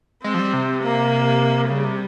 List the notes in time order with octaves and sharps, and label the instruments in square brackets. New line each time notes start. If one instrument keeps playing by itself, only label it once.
[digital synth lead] G#3 [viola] C4
[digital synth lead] F3
G3
C3
[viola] A#3
[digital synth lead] C#3 [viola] G3
[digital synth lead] C3